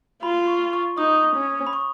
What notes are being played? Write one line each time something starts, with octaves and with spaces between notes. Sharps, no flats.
F4 B5
C#6
C#6
D#4 D#6
C#4
B5
C#6